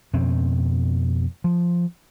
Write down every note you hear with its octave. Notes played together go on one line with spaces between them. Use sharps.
F2 B2 C4 C#4
F3